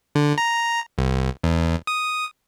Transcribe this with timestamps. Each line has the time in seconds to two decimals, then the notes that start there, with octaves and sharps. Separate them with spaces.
0.15 D3
0.38 A#5
0.98 C2
1.44 E2
1.87 D#6